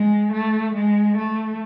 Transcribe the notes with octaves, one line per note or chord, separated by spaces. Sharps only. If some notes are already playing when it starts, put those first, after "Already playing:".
Already playing: G#3
A3
G#3
A3